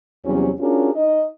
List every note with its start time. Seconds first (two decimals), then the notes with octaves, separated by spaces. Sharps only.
0.25 E2 C3 F#3 G3 C#4
0.59 C#4 D4 F4 F#4 G#4 A#4
0.94 D#4 D#5